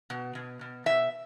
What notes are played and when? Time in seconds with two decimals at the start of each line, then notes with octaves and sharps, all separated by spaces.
0.10 B2
0.35 B2
0.61 B2
0.86 B2 E5